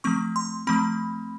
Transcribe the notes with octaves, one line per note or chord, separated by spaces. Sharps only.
F3 A3 C4 C#6
C6
F3 A3 C4 B5